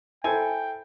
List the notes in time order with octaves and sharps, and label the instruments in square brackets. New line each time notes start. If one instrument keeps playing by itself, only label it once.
[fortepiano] E4 A4 C5 [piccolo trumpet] G5 [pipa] G#5